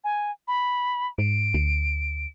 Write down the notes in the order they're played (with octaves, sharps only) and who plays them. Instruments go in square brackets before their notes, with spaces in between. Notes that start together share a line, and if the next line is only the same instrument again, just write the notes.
[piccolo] G#5
B5
[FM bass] G#2 [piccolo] D7
[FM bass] D2